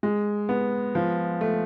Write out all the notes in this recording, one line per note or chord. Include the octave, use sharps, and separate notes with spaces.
G#3
B3
F3
A3